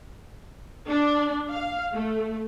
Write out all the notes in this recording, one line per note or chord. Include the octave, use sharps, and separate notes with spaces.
D4
F5
A3